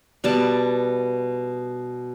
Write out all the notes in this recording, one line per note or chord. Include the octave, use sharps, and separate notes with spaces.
B2 G3 B3 A5